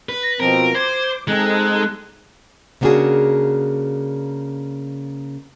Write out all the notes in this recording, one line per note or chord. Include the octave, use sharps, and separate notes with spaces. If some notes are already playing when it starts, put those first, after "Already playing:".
B4
A#6
B2 F3 C4 A#4 D7
C5 D6 G#6
G#3 C4 D#4 A4 F#6
C#3 A#3 B3 D4 F#4 G#4